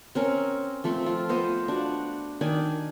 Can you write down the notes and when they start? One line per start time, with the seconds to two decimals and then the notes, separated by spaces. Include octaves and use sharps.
0.15 C4 C#4 A#4
0.84 F3 A3 C4
1.06 F4
1.29 B3 C5 D#5 F5
1.68 D4 F#4
2.41 D#3 D4 D5 G#5